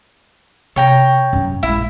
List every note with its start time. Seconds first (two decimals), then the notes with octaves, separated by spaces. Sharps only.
0.76 C3 C#5 G5 A#5
1.33 F#2 C#4
1.63 A#1 G#3 E4